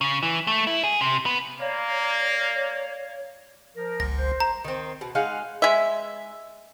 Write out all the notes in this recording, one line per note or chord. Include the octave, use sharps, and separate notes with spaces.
C#3
E3
A3
E4
G#4
C3
B3
A#3 C#5 D5 F5
F3 A#4
G1 C#2 A#6
C5
A#5
D#3 C4
B2
G#3 D#4 F5 F#5
G#3 E5